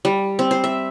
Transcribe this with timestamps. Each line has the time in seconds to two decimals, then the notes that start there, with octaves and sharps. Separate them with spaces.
0.05 G3
0.39 C4
0.51 C5
0.64 E5